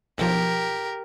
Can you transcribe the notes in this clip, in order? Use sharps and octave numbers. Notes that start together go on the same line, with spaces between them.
B1 F3 G4 A#4